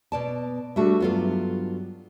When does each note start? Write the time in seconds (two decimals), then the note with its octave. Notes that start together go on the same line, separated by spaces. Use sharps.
0.12 B2 D5 A5
0.76 G3 A3 D4 F#4 E5
1.00 G2 F#3 B3 F4 A4